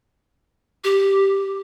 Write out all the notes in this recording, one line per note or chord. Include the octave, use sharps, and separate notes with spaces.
G4